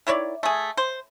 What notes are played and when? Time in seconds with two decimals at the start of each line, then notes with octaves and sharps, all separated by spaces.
0.07 D#3 E4 C#5 D5
0.43 A3 G#4
0.77 C5